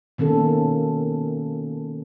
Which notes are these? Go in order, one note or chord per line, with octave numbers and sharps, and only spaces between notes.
B2 D#3 A#3 C#4 A4